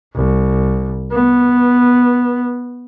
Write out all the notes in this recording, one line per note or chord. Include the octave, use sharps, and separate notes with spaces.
C2
B3